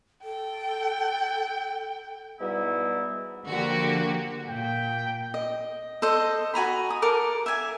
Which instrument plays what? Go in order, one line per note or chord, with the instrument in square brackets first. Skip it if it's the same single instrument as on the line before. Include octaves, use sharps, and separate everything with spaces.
[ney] A4 [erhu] G5
[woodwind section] G#2 B2 E3 G3 B3 E4
[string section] D3 F3 A#3 F#4 G4
[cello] A#2 [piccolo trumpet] G5
[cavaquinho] D#5
A4 C5 D#5
F#4 G#5 A#5 B5
D#6
A4 A#4 D6
E5 G#5